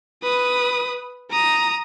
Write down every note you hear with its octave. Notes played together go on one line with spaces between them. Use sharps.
B4 D#6
A#5 D#6